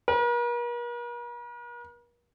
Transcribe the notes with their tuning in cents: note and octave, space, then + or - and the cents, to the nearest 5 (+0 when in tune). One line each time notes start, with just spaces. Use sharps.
A#4 +45